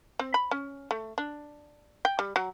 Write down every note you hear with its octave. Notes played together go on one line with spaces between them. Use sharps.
C4
B5
C#4
A3
D4
G5
G3
F#3